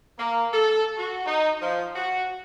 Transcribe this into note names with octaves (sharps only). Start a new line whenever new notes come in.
A#3
A4
F#4
D#4
F3
F#4